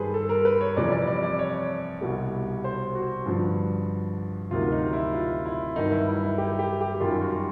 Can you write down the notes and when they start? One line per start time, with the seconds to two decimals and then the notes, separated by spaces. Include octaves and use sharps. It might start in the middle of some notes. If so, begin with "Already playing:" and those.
Already playing: G2 D#3 G3 G#4 B4 C5
0.14 A4
0.29 A#4
0.45 B4
0.61 C#5
0.76 F2 C3 E3 G3 D5
0.92 D5
1.07 D5
1.23 D5
1.39 C#5
2.01 C2 B2 G3
2.64 C5
2.95 F#4
3.26 G2 D3 F3
4.51 D2 C3 D#3 F#3 F4
4.72 D#4
4.93 E4
5.13 F4
5.45 E4
5.76 G2 D#3 F#3 D#4
5.92 E4
6.07 E4
6.23 E4
6.38 G4
6.59 G4
6.81 G4
7.01 F#2 D#3 G3 F4
7.22 F#4